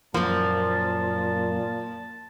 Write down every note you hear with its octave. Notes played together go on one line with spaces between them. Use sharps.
F#2 A#2 F3 A#3 A5